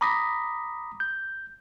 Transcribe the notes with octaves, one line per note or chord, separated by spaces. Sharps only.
A#5 B5 D6 D#6 A#6 B6
G6